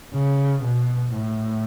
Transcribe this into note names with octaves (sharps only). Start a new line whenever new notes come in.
C#3
B2
A2